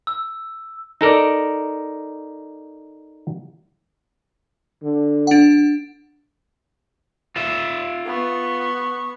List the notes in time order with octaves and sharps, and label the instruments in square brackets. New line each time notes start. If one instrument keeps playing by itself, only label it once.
[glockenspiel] E6
[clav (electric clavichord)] D#4 A4 A#4 D5
[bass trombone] D3
[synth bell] D4 F#5
[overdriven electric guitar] F4 E5
[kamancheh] B3 C#6